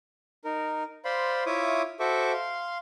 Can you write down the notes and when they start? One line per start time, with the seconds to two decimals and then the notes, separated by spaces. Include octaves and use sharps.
0.45 D#4 A#4
1.05 C5 D5 F5 B5 C6
1.46 E4 F4 C#5 E5 D6 D#6
2.00 F#4 A4 C5 E5 C#6 D6
2.33 F5 C6